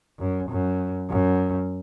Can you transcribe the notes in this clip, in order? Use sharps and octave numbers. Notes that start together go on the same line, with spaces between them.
F#2
F#2
F#2